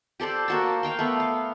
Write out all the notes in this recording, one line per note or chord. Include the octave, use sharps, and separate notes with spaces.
G4 A4 C5 D5
A#3 F#4 A5
F5 G5 C6
A3 B3
F5